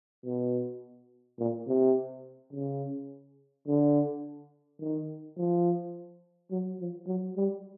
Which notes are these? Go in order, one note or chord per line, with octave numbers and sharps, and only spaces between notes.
B2
A#2
C3
C#3
D3
D#3
F3
F#3
F3
F#3
G3